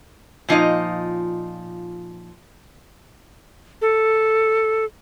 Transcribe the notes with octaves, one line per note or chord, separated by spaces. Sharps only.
A#2 F3 D#4 D#5
A4